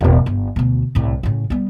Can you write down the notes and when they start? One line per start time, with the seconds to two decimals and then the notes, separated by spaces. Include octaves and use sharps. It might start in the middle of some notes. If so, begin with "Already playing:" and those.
0.01 E1 A1
0.26 G1
0.56 D2 B2
0.95 C2 A2
1.23 A2 C#3
1.50 G3 B3